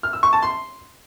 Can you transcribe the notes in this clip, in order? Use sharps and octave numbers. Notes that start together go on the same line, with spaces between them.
F6
E6
C#6
A5
C6